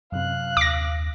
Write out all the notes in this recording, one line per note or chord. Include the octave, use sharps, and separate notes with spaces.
F#2 C3 F5 F#6
D#2 D6 A#6